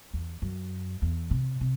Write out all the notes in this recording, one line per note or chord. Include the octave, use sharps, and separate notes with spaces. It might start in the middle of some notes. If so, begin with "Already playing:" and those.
E2
F#2
E2
C3
C3